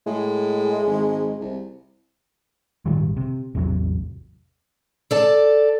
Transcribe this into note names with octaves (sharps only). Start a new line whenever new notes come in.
A2 G#3
G#1
C2
G#1 A#2 D#3 G3
C3
A1 E2 C3 F#3
A4 D5 A5